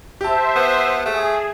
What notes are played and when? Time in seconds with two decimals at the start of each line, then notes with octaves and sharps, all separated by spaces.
0.21 G4 C5 E5 A5
0.56 B3
1.06 A3 G#4